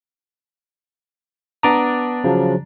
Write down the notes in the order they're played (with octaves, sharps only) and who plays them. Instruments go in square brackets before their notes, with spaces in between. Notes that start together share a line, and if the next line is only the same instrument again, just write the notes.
[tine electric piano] B3 D6 D#6 [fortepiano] D4 A#5
[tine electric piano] C#3 F3 F#3